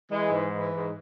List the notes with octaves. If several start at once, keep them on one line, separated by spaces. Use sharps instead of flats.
E3 G#3
G#2
E3
G#2